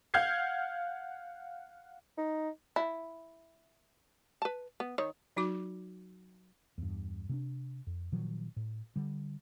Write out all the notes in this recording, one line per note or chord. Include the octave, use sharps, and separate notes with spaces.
F5 F#5 F6 G6 G#6 C7
D#4
E4
B4 A5
B3
D#3 C#5
F#3 D#4 F#4 D6
E2 G2
C3 C4 D4
F2
A#2 D#3 F3 F#3
A2
D3 G3